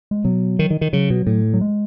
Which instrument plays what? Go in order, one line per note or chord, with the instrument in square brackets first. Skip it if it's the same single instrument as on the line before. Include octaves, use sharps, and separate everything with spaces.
[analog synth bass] G#3
[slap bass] B2 [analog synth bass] F#3
[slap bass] D#3
D#3
D#3
[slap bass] C#3 [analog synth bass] F#3
[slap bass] B2
A2
[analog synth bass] F#3
G#3